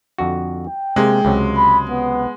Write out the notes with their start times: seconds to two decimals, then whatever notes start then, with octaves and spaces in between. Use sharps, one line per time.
0.18 F2 D3 F#4
0.67 G5
0.96 C3 G#3 A#3
1.25 C#2 C3 F#3
1.57 B5
1.89 B3